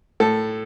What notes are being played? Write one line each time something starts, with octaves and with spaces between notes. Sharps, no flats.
A2 A4